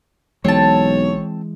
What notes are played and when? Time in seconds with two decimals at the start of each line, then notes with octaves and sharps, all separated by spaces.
0.45 B1 E3 G#3 C4 C#5 A5